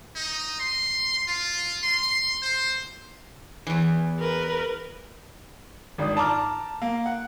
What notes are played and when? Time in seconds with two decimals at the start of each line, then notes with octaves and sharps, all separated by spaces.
0.16 D#4
0.60 C6
1.28 F4
1.83 C6
2.43 C5
3.67 E2 E3
4.19 A#4 B4
5.98 G#1 D4 D#6
6.17 A5 A#5 D6 F6
6.82 A#3
7.06 F#5